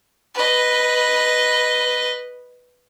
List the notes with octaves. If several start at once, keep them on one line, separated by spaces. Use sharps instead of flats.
B4 D#5